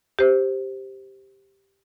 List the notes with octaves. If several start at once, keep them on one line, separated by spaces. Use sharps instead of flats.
G4 C5